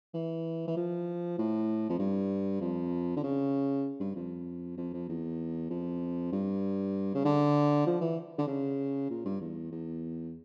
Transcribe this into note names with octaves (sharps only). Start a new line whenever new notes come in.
E3
E3
F3
A2
F2
G2
F2
D3
C#3
G2
F2
F2
F2
E2
F2
G2
C#3
D3
F3
E3
D3
C#3
A#2
G2
E2
E2